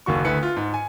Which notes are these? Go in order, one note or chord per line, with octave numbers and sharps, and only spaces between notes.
F#1 D#2 F#4 C#6
D2 A3 E4 B4 C#7
F4
G#2
G#5